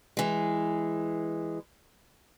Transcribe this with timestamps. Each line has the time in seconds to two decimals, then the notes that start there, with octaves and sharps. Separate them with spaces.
0.17 E3 G#3